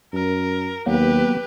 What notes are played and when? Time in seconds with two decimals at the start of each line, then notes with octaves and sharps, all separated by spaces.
0.13 F#2 A#4
0.86 D#2 F#3 A#3 B3 G4 B4